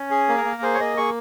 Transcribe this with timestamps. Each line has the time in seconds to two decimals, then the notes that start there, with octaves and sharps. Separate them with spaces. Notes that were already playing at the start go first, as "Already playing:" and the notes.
Already playing: C#4
0.11 G#4
0.29 A#3
0.37 A#4
0.45 A#3
0.62 G#4 C5
0.74 C#5
0.80 A#3 D#5
0.97 G#4 C#6